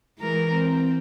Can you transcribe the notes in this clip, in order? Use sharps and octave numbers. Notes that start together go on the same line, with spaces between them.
E3 G#3 A#4
C4